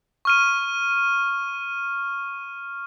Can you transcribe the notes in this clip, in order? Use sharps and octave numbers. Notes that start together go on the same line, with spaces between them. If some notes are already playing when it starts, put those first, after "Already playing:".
C#6 F6 D#7